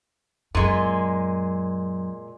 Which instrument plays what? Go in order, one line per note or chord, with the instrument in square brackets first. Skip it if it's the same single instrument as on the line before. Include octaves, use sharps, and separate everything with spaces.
[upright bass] F#2 [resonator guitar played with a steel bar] A#2 G#3